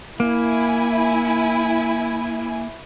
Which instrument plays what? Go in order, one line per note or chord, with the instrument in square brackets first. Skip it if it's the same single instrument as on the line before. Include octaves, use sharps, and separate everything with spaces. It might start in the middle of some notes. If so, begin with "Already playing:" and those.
[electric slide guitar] A#3 [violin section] E4 G#5